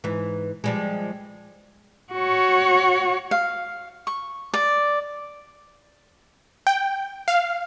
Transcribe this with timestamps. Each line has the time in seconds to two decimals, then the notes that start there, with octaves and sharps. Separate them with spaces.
0.04 G#2 E3
0.64 F3 G3 G#3
2.13 F#4 C#5
3.31 F5
4.07 C#6
4.54 D5
6.67 G5
7.28 F5